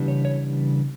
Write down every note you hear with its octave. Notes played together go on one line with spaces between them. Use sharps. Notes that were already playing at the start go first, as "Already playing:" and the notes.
Already playing: C#3 E3 G3 B3 D4
C#5
C#5